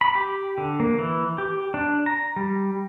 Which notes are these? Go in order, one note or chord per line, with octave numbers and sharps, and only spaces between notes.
B5
G4
D3
A#3
E3
G4
D4
A#5
G3